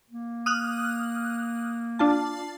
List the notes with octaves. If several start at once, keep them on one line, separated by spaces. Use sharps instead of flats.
A#3
D#6 F6 F#6
D4 F4 A5